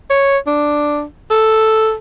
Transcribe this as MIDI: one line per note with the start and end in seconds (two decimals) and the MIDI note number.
0.10 0.37 73
0.47 1.04 62
1.31 1.95 69